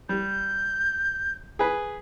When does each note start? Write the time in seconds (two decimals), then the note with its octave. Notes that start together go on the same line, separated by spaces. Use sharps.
0.09 G3 G6
1.59 G#4 B4